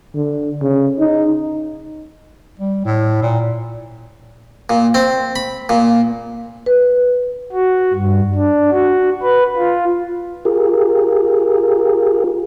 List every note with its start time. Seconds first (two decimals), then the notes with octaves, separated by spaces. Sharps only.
0.15 D3
0.61 C#3
0.99 D#4
2.59 G3
2.85 A2
3.22 A#2
4.69 A#2
4.94 C4
5.36 B5
5.69 A#2
6.66 B4
7.52 F#4
7.94 G2
8.34 D4
8.71 F#4
9.23 B4
9.57 F4
10.45 F4 G4 G#4 A#4